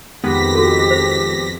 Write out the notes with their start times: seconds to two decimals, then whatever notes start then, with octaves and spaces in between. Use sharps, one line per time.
0.24 F2 D#3 G#3 B3 G4 A#6 B6
0.55 F#4 A4
0.91 C5